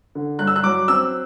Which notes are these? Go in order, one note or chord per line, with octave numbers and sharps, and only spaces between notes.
D3
G2 F#6
E6
F#6
F#3 D6
C4 E6